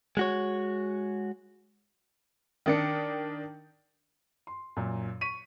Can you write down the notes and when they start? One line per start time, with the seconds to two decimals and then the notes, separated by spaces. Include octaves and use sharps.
0.17 G#3 F#4 C#5
2.66 D#3 D4 C#7
4.47 C6
4.77 F#2 A#2
5.21 C#6 B6 D#7